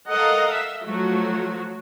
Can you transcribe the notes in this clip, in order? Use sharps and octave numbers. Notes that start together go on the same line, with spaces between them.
A4 A#4 D#5 F5 F#5
E5
F3 F#3 A3 F#4